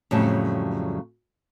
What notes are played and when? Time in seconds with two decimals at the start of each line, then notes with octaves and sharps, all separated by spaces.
0.11 F2 A2 C#3 F#3 G3 A5